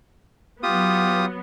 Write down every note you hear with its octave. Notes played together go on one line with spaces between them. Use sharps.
F#3 B3 F4 G4 D#6